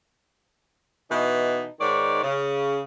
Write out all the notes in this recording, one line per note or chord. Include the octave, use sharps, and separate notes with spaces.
B2 E3 D#4
G#2 D#3 C#5 D5
C#3